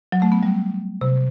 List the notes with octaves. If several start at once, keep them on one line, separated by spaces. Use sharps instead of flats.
F#3
A3
B3
G3
C3